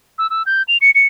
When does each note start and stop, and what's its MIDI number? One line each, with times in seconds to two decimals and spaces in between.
0.19 0.30 88
0.30 0.43 88
0.46 0.63 91
0.68 0.77 101
0.81 0.91 97
0.95 1.07 97